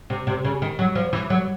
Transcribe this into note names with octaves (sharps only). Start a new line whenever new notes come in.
C3
C3
C#3
D#3
F#3
F3
E3
F#3